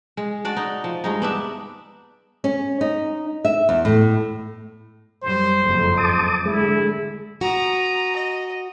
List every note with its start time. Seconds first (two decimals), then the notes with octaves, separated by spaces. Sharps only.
0.17 G#3
0.45 D4 F#4 D5
0.57 D#4
0.84 F3
1.04 G2 G#3 D#4
1.22 B3 D4 E5
2.44 C#4
2.81 D#4
3.45 E5
3.69 E2
3.85 A2
5.23 F#2 G3 C5
5.65 F#1 F2 G#2
5.97 A5 D6 D#6
6.46 D3 G#3 E4
7.41 F#4 A#5 D#6
8.15 D#5